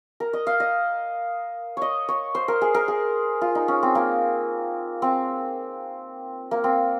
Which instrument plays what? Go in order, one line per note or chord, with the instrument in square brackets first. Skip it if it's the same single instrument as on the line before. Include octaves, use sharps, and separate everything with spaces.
[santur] A#4
D#5
F5
D#5
C#5 D#5
C#5
C5
A#4
G#4
A#4
G#4
F4
D#4
C#4
C4
A#3
C4
A#3
C4